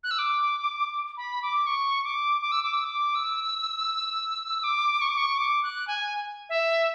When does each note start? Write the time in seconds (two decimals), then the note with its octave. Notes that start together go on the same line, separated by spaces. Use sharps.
0.04 F#6
0.11 E6
0.19 D6
1.17 B5
1.42 D6
1.67 C#6
2.04 D6
2.41 D6
2.52 E6
2.63 D6
2.74 E6
2.85 D6
3.15 E6
4.64 D6
5.01 C#6
5.09 D6
5.17 C#6
5.38 D6
5.63 F#6
5.88 G#5
6.49 E5